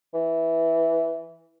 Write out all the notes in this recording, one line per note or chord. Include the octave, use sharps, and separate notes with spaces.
E3